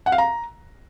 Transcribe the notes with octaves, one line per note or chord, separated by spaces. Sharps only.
F#5
F5
A#5